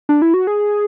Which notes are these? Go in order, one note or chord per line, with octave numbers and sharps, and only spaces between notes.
D4
E4
F#4
G#4